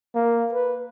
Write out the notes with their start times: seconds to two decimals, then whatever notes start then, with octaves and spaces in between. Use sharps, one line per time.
0.15 A#3
0.53 B4